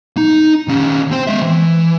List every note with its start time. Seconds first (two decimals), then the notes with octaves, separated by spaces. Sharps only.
0.17 D#4
0.68 D#3 C#4
1.11 C4 C5
1.27 G#3 E5
1.42 E3